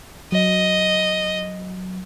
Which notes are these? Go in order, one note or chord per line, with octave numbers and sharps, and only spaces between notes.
F#3 D#5